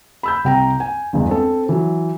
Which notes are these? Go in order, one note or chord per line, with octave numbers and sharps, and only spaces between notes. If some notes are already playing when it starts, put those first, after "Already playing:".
B5 E6 G6
C2 G5 A#5
G#5
G1 E2 G#3
C4 A4
E3 F#3